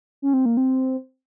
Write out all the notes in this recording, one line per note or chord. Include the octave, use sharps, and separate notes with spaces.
C#4
C4
A#3
C4